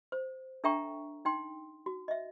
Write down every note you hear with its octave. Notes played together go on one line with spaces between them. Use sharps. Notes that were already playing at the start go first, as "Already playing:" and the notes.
C5
D4 A4 E5 G5 A#5 C#6
D#4 G5 C6
F#4
D#5 E5